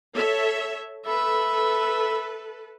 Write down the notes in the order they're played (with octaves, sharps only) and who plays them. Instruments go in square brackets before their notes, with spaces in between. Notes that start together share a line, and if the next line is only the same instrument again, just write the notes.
[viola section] A4 C#5 E5
[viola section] A4 B4 [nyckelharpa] E5 B5